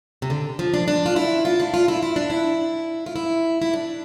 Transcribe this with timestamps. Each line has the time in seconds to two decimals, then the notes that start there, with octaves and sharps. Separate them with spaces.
0.22 C3
0.30 D3
0.59 F3
0.74 D4
0.88 D4
1.06 F4
1.16 E4
1.45 F4
1.60 D4
1.74 F4
1.88 E4
2.03 E4
2.16 D4
2.30 E4
3.06 F4
3.16 E4
3.62 E4
3.73 D4